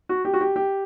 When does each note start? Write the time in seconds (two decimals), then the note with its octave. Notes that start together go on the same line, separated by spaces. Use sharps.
0.09 F#4
0.25 G4
0.34 F#4
0.41 G4
0.56 G4